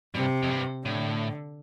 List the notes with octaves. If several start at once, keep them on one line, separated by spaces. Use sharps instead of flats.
G2 C3
F2
G2
A2 D3